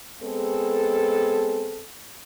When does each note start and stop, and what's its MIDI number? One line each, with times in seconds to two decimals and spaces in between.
0.22 1.83 56
0.22 1.83 59
0.22 1.83 60
0.22 1.83 68
0.22 1.83 69